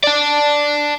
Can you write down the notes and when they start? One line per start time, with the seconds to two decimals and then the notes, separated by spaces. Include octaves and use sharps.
0.04 D5 A5